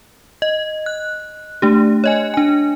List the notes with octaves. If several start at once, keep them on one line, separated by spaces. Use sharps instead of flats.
D#5
F#6
A3 D4 G4
C#5 D#5 G#5
D4 G#5